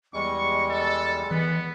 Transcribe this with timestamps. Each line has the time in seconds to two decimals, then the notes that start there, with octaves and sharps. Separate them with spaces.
0.14 E2 G3 G#3 D#5 C#6
0.70 A4
1.31 E3 B3